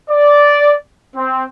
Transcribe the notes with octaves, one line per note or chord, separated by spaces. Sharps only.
D5
C4